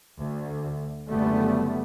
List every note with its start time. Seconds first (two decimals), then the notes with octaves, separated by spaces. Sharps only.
0.21 D2
1.11 F#1 F#2 D3 G3 A3 B3